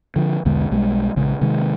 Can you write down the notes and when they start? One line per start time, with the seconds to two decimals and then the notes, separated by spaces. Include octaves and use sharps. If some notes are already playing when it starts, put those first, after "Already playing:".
0.16 D3 F3
0.45 B1 E2 D3 G#3
0.71 B1 G3 G#3
1.16 A#1 C#3 G#3
1.41 C3 D#3 G#3